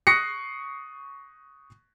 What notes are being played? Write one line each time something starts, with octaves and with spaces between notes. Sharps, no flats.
C#6 D#6 F#6 A#6 C7 C#7